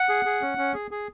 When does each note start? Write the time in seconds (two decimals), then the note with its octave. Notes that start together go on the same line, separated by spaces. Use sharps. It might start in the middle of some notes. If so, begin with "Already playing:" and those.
Already playing: F#5
0.09 G#4
0.25 G#4
0.41 C#4
0.58 C#4
0.74 G#4
0.91 G#4